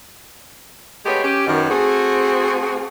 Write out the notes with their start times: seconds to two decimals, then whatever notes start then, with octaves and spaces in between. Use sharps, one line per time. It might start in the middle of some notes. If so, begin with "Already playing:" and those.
1.05 G#3 A3 B3 G4 G#4 C#5
1.24 C#4 G4
1.47 F#2 B2 D#3
1.69 A3 C4 F#4 G#4